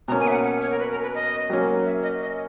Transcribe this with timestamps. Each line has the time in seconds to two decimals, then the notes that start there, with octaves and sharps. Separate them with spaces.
0.08 B2 A#3 C#4 A#5
0.20 G#5
0.27 E5
0.32 F#5
0.44 F#5
0.61 C#5
0.71 A#4
0.79 B4
0.91 A#4
1.02 B4
1.15 D#5
1.50 F#3 A#3 C#4
1.85 E5
2.03 D#5
2.21 D#5